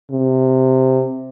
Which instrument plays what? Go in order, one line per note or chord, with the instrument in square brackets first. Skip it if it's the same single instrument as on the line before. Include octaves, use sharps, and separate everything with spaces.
[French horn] C3